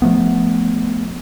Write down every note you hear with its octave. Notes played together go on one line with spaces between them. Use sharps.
F3 A3 B3